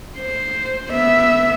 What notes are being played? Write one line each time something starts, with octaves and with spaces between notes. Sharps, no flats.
C5
B3 E5